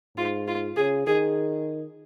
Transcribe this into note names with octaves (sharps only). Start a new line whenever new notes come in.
G#2 F4
F4
C#3 G#4
D#3 G#4